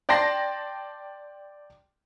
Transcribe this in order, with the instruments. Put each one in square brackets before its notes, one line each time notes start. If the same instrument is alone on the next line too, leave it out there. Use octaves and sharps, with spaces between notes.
[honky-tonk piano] D5 G5 A5 C6 A#6